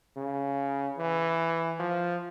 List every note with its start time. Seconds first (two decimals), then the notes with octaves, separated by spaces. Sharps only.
0.17 C#3
0.98 E3
1.80 F3